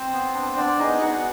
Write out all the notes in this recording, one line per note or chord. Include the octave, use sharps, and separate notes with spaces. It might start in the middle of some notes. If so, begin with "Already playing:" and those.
Already playing: C4 C5
B3
D4
B3 D4 D5
D#4 G#4 D#5
B3 F#4 F#5